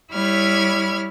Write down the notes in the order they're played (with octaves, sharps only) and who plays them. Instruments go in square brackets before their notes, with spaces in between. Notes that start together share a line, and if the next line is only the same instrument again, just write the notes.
[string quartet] G3 E4 C#5 B5 F6 G#6